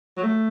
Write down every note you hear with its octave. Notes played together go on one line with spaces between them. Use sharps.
F#3
A3